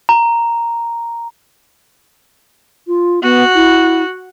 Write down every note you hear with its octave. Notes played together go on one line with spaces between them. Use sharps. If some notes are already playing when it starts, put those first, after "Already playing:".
A#5
F4
B3 F#4
E4